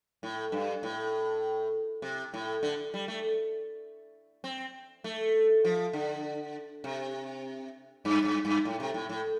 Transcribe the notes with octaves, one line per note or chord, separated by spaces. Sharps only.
A2
G2
A2
C3
A2
D3
G3
A3
C4
A3
F3
D3
C3
G2
G2
G2
A2
C3
A2
A2